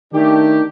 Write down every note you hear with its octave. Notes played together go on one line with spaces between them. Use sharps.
D#3 A3 D4 G4